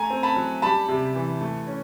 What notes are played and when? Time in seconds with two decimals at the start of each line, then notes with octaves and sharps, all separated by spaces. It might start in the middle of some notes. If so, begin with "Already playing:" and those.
Already playing: A3 G#5 A#5
0.10 C4
0.23 A5 B5
0.36 F#3
0.62 G3 A5 B5
0.88 C3
1.15 E3
1.41 A3
1.67 C#4